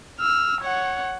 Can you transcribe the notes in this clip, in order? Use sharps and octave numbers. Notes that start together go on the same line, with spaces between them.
E6 F6
C#5 F#5